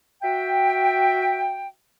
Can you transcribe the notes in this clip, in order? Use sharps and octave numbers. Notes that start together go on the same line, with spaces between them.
F#4 E5 G5